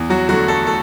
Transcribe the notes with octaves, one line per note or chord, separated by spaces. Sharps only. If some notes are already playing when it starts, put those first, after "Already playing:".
Already playing: E2
F#3 F#4
D3 F#3 A3 F#4
A3 A4
A3 A4